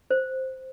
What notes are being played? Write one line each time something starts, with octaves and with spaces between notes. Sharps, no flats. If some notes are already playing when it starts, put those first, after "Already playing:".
C5